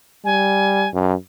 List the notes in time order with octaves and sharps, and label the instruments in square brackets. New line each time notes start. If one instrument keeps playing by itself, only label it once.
[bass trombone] G3 [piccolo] G#5
[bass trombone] F#2